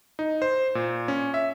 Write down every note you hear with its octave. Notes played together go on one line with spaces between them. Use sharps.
D#4
C5
A#2
C#4
E5